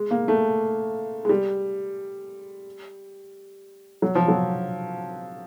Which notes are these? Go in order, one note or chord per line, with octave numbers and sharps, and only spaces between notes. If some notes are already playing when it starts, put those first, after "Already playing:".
Already playing: G#3
A#3
A3
G#3
G3
F#3
F3
F#3